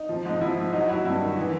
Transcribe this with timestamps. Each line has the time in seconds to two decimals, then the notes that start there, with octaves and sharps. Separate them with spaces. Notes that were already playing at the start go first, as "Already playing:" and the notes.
Already playing: D#4
0.09 F3
0.25 G#2 D#4
0.41 F3 E4
0.58 G#2
0.73 F#3 D#4
0.89 F#3 E4
1.05 G2 E4
1.21 D#3
1.37 E3